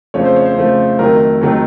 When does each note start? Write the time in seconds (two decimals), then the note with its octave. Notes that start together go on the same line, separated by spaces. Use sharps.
0.14 F2 C#3 F3 A3 C#5
0.25 C5
0.36 C#5
0.46 C5
0.56 F2 C#3 F3 A3
0.99 F2 D#3 F#3 A3 A#4
1.41 F2 D#3 F#3 A3